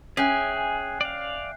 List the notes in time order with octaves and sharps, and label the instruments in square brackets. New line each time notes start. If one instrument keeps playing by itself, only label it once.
[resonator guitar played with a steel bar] C#4 [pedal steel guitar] G#4 [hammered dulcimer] E5 G5 G#5 [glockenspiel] F#6 G6 C7
[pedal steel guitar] D5 F5